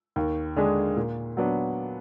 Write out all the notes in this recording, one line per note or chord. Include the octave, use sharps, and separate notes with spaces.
D#2
D3 G#3 D4 G#4
A#2
F#3 B3 D4